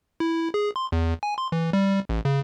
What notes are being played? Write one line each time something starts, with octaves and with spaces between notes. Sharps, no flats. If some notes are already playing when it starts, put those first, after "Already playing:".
E4
G#4
C6
E2
G#5
C6
E3
G3
A1
C#3